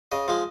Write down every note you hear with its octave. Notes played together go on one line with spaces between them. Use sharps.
C#3 D#5
F3 G#3